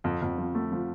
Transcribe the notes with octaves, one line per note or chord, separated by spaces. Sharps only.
F2
F2
F3
A3
F3